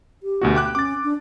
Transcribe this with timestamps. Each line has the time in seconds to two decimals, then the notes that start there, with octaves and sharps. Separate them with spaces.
0.23 G4
0.42 D2 B2 F#4
0.55 G5 D6 F#6
0.75 C#4 D6 A6
1.04 D4